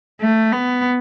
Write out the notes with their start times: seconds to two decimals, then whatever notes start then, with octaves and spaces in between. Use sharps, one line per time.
0.21 A3
0.52 B3